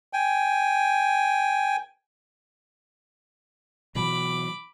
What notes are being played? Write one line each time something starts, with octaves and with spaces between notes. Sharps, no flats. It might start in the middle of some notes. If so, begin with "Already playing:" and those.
G5 G#5
B2 E3 F#3 B5 D6